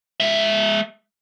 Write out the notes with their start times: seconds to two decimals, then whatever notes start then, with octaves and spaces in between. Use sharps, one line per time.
0.20 G#3 E5